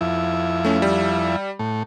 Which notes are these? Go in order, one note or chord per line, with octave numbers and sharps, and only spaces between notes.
F2 E4
A3 C#4
G3
A2